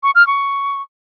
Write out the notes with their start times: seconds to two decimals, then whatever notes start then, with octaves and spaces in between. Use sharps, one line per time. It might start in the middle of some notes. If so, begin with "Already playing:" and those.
0.03 C#6
0.15 F6
0.27 C#6